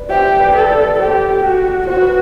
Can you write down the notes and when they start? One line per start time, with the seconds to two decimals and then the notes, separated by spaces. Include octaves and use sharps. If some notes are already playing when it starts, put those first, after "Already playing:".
Already playing: B4 D5
0.10 G4 C5 E5
0.40 B4 D5
0.55 A4
0.69 B4 D5
0.99 G4 A4 C5
1.43 F#4
1.87 F#4 C5
2.01 B4